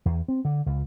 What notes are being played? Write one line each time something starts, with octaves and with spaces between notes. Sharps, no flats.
E2
C4
D3
C#2